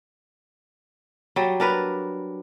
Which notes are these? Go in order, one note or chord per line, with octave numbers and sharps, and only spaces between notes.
F#3 G3
D4 A#4 B4